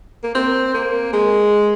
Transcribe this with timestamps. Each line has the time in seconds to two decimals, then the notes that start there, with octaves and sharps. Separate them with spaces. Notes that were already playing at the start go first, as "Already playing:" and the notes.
0.24 A#3
0.35 C4
0.74 A#3
1.13 G#3